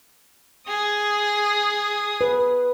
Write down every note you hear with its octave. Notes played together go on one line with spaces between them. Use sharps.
G#4 D#6
B4